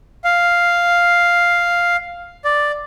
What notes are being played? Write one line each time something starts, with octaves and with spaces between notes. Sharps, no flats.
F5
D5